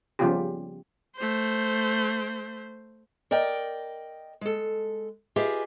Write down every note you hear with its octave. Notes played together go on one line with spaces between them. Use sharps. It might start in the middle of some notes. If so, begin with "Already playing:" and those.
C#3 F3 G3 B3 F4 G4
A3 C5
A#4 D5 D#5 G5
G#3 A4
F4 G4 G#4 B4 D#5 E5